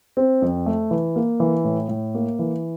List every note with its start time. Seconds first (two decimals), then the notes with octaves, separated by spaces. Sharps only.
0.17 C4
0.42 F2
0.66 A3
0.91 E3
1.16 A#3
1.40 E3
1.64 A2
1.89 A2
2.14 A#3
2.39 E3